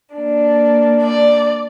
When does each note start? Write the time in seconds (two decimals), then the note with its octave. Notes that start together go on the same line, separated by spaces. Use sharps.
0.16 A#3 D4
1.03 D5